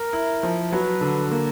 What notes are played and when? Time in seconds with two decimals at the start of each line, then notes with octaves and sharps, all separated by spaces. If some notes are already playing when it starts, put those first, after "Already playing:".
Already playing: A#4
0.13 E4
0.43 F3
0.72 F#3 B4
1.01 D3
1.31 A#3